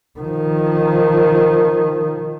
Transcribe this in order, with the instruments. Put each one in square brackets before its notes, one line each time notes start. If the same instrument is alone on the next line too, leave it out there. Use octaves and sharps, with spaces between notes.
[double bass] D#3 F3